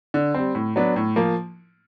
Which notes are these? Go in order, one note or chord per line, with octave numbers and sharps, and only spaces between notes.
D3
G3 C4
A2
F#3 B3 D4
A2
F3 A#3